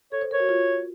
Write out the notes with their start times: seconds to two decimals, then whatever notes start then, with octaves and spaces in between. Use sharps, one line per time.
0.12 A4 C#5
0.21 C5
0.31 A#4 C#5
0.40 F#4
0.49 F4